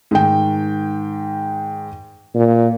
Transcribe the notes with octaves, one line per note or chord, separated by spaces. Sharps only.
G#2 D#3 G5
A#2